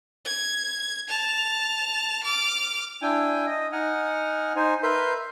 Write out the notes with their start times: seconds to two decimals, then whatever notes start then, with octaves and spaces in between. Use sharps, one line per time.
0.25 G#6
1.08 A5 F7
2.24 D6 F6
3.02 D4 E4 G5 G#5
3.46 D#5
3.72 D#4 F#5 G#5 F6
4.56 D#4 C5 G#5
4.83 A#4 B4 E5 C6 G6